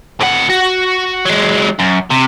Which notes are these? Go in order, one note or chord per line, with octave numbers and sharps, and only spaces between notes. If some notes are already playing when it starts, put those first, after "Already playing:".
A2 F#5
F#4
F#3 G#3
F#2
C3